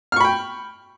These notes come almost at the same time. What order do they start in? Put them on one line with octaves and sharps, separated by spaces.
F6 C#6 B5 G5